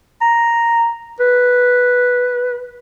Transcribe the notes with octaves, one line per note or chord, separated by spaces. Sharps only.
A#5
B4